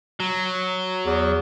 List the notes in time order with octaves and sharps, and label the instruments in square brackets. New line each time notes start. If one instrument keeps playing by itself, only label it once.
[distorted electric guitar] F#3
[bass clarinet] E2